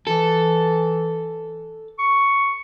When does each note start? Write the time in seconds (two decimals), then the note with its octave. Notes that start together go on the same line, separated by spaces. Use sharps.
0.07 E3 A4
1.99 C#6